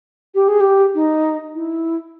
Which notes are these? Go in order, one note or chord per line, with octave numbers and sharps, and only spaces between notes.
G4
G#4
G4
D#4
E4